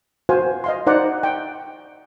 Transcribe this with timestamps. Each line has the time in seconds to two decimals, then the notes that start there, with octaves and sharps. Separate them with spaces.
0.29 F#4 B4 C5 F5 G#5
0.64 D#5 F5 C6
0.87 D#4 C5 D5 F#5 A#5 D6
1.23 G5